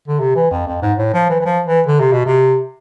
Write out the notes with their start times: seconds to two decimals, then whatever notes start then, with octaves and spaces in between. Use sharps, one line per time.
0.08 D3
0.20 C3
0.36 E3
0.51 F2
0.67 F2
0.82 G#2
0.98 A2
1.13 F3
1.29 E3
1.40 E3
1.45 F3
1.66 E3
1.87 D3
2.00 C3
2.12 B2
2.26 C3